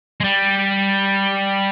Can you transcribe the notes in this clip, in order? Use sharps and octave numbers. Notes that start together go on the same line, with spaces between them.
G#3
G3